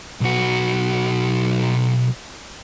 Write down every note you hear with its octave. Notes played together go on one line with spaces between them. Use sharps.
B1 F#4